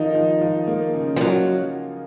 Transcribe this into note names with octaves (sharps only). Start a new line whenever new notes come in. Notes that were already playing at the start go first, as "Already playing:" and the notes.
Already playing: D#3 F3 D#4
F3
F3
A#3
C#3
F3
F#3 A#3